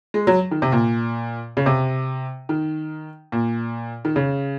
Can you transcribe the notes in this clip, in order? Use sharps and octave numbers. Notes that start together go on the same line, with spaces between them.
G#3
F#3
D#3
C3
A#2
C#3
C3
D#3
A#2
D#3
C#3